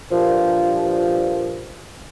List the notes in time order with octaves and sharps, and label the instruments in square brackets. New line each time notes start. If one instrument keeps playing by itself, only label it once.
[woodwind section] G2 A#2 F3